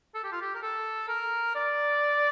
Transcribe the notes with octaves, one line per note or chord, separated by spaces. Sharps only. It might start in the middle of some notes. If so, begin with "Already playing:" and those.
A4
G4
F4
G4
A#4
A4
A#4
D5